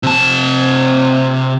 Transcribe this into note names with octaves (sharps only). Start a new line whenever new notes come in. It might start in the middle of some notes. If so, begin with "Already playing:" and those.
C3 A5